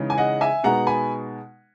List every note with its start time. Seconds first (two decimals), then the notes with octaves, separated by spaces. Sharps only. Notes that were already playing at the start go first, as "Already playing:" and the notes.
Already playing: C#3 E3 G#3 D#4
0.10 G#5
0.18 D#5 F#5
0.41 E5 G#5
0.64 B2 G#3 B3 D#4 F#5 A#5
0.87 G#5 B5